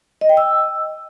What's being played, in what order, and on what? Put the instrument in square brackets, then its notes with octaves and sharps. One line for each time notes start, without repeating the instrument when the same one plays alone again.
[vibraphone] D#5
G5
E6